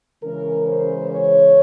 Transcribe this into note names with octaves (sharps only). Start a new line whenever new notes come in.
C#3 E3 G#3 C#4 A#4
C5
C#5